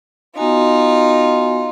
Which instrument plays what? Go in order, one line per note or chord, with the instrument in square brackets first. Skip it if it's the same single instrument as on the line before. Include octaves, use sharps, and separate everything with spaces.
[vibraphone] B3 F#4 G#5 [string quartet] D#4 F4